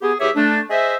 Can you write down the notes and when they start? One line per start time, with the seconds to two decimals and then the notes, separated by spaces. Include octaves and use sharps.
0.02 B3 G4 G#4
0.20 E2 G4 G#4 C#5 E5 D6
0.36 A3 D4
0.70 G#4 C5 D#5 E5